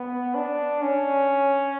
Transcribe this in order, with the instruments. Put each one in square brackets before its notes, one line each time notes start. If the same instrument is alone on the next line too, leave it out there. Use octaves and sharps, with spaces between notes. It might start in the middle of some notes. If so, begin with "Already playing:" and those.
Already playing: [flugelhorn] B3
D4
C#4